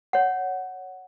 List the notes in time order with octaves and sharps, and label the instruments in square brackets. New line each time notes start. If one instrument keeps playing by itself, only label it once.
[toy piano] C#5 F#5